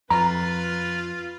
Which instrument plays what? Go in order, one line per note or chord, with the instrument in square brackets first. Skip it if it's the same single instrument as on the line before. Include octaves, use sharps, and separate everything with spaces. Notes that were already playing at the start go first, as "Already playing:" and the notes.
[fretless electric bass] F2 [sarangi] F4 [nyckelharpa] B4 [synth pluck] A#5